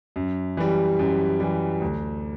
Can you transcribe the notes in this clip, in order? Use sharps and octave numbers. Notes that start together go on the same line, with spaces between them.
F#2
E3 G3
F#2
E3 G3
D2